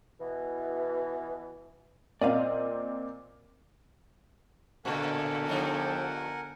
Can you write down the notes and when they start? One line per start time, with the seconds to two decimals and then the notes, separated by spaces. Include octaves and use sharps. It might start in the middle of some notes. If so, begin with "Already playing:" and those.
0.20 B2 E3
2.22 A#2 C4 D5 D#5 F5
4.85 A2 D3 B3 A4 A#4 F#5 G#5
5.49 G2 F3 D#4